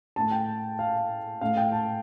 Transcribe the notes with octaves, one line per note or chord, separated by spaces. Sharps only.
A2 A3 A5
G5
F5
A2 A3 F5
G5
A5